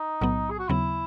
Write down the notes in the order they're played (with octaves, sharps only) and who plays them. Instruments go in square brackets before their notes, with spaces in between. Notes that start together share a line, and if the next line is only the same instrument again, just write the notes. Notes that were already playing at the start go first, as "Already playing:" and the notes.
Already playing: [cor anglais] D#4
[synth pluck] B1 A2 F#3 B3
[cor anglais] G#4
F#4
[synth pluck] D#2 C#3 F#3 B3 [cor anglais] E4